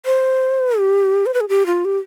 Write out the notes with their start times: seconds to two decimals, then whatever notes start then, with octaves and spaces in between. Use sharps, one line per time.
0.06 C5
0.77 G4
1.26 C5
1.34 B4
1.41 G#4
1.49 G4
1.66 F4
1.85 G4